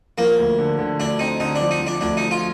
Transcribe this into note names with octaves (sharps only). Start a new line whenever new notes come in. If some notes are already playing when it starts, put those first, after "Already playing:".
F3 A#3
D2
D3
D3
D2 D4
C4 D#4
D3 D#4
D4
F3
D#4
F3
D4
D2 D4
F3 D#4
F4